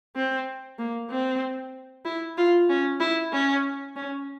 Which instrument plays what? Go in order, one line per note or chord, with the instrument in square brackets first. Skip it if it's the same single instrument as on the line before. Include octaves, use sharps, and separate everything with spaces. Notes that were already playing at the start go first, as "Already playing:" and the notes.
[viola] C4
A#3
C4
E4
F4
C#4
E4
C#4
C#4